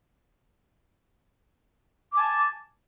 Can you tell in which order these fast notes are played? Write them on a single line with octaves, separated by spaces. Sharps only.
D6 G#5 A5